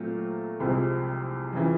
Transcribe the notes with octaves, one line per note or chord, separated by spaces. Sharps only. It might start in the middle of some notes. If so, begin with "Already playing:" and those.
Already playing: A#2 F#3 A3 C4 F4
C2 C3 F3 G#3
F2 C#3 E3